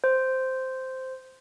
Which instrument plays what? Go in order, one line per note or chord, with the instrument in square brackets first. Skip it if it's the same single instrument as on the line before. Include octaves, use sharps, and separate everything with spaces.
[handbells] C5